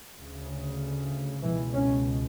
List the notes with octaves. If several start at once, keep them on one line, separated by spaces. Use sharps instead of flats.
D2 C#3
C#2 B2 E3
C#4